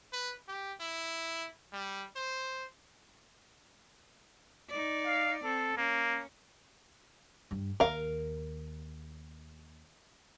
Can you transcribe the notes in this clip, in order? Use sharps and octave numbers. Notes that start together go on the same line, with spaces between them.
B4
G4
E4
G3
C5
D#4 D5
F5
C4 A4
A#3 C#4
G2
D#2 A#4 F5